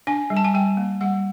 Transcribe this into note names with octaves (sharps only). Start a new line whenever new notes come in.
D4 G#5
G3
A5
G#5
G3 G5
A#3
G3 F#5